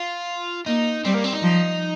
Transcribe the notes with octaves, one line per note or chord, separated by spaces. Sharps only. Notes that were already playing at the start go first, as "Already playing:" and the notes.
Already playing: F4
A#3 D#4
G3 C4
A#3
C4
D#4
F3